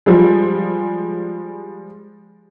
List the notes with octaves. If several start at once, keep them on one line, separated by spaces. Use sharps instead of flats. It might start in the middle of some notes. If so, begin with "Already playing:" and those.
F3 G3 G#3